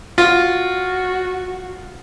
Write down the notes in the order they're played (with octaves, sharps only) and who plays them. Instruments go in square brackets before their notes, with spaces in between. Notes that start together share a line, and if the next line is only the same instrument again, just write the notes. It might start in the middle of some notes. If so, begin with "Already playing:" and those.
[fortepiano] F4 [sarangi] F#4